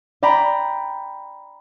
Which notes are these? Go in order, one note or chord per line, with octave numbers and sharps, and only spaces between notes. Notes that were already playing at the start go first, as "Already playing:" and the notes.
D5 G5 A#5 B5